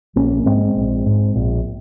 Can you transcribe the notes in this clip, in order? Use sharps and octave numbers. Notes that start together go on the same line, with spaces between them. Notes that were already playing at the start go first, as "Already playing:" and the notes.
A#1 A#3 C#4
G#2 G#3 C4
A#1
G#2
A#1